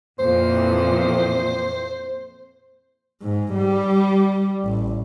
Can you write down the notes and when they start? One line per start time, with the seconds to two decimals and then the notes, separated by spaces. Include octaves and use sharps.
0.19 F2 A#2 E3 C5
3.22 G#2
3.54 G3
4.65 A1